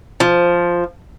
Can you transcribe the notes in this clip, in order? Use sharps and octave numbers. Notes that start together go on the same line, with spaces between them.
F3